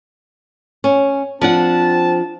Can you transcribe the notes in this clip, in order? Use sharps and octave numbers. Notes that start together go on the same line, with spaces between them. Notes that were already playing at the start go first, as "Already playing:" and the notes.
C#4
F3 C4 D4 F#5 A5